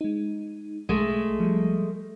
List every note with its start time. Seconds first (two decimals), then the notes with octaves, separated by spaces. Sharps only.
0.01 G#3 D#4
0.89 B1 G#3 A3
1.40 F3 G3